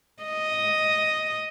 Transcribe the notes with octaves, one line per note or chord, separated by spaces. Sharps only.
D#5